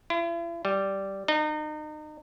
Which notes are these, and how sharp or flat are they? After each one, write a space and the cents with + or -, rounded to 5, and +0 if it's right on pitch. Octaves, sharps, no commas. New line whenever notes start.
E4 +45
G3 -5
D#4 -35